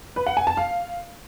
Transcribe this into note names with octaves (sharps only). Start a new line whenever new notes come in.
B4
F#5
G#5
A5
F5